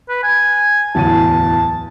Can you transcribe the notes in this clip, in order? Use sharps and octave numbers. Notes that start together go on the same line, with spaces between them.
B4
G#5
D1 E2 A5 D#7